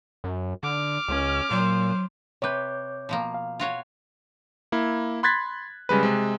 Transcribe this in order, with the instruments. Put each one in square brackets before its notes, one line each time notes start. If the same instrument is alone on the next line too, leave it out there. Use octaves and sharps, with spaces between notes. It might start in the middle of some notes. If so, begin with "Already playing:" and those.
[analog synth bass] F#2
[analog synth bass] D3 [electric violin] D6 F6
[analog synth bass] C#2 [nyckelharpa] C#4
[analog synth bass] A#2 [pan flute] F#3 [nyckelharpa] C5
[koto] C3 B4 [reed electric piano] C#5 D6 G6
[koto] B2 F3 A#3
[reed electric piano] F5
[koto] F4 F#4 C#5
[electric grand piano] A#3 E4
B5 C6 F#6 G#6 A6 B6
C#3 G3 G#3 B4
C3 G#3